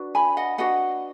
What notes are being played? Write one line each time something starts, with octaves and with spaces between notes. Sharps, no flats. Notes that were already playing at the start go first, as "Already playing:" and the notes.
Already playing: D4 F#4 B4
G#5 B5
D#5 F#5
D4 F#4 B4 D#5 F#5